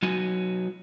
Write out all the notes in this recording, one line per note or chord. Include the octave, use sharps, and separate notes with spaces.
F#3 D#4 F#4 G#5